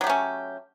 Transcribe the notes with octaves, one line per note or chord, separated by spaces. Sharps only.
F#3 A3 C#4 G4